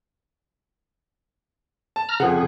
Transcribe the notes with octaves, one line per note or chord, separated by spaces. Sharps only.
A5
A#5 F6
F2 C#3 F3 G#4 F#5